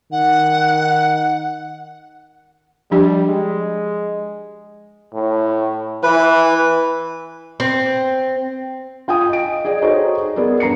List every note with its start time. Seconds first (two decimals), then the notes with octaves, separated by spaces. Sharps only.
0.12 D#3 F#5
2.91 F3 G3 D4 G4
3.27 G#3
5.14 A2
6.03 E3 B4
7.60 C4
9.08 F4 G5 G#5 D#6
9.29 D#5 D7
9.65 G#4 D5 D#5 G5
9.82 D#4 F#4 G#4 A4 C5 C#5
10.36 B3 G#4 A#4 D5
10.60 G2 A#5 C7 C#7